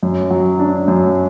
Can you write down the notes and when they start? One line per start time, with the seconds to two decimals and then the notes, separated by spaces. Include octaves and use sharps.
0.03 F#2
0.30 F#3
0.59 D4
0.88 F#2